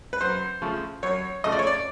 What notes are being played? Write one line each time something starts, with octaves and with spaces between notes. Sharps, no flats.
B4
F#2 C5
C#3 F3 A3
F#2 C#5
C#3 F3 A3 D#5
D5
C#5
D5